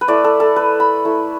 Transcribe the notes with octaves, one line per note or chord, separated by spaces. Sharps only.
B4
A3 E4 D5
A4
A4
B4
B5
A3 E4